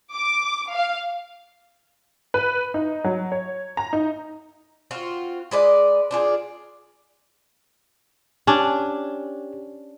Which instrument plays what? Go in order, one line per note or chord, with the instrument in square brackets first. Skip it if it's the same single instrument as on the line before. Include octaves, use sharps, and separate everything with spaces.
[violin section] D6
F5
[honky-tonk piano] B4
D#4
F#3
C#5
A#5
D#4
[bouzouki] C4 F4 F#4
G#3 B4 D5 D#5
D4 F4 G#4
[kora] C#4 D4 [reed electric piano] G4